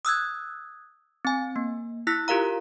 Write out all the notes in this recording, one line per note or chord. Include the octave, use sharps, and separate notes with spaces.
D#6 E6 F#6 G#6
C4 G#5
A#3
E4 E6 F#6 A#6 B6
F4 G4 A#4 F5 A#5